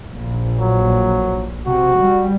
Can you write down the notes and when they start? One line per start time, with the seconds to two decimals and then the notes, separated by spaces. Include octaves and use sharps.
0.12 A#1
0.60 F#3
1.66 C3 F#4
2.00 G3